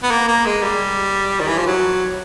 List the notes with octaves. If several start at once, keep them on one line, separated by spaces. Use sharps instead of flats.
B3
A#3
A#3
G#3
G3
D#3
E3
F3
F#3